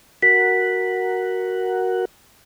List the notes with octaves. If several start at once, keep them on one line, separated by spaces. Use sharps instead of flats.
F#4 A#4 F#5 B6